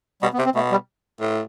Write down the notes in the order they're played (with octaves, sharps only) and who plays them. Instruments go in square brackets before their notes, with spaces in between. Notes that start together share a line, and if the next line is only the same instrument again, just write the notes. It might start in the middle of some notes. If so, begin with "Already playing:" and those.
[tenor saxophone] B2 [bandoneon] G3
[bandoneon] B3
[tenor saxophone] C3
[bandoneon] C4
[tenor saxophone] B2 [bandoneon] A3
[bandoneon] G3
[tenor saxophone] A2